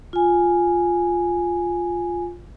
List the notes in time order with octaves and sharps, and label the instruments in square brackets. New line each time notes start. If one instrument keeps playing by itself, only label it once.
[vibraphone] F4 G#5